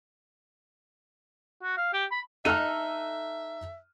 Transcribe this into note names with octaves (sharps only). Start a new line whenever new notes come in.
F#4
F5
G4
B5
D#4 A4 E5 F6 F#6 D#7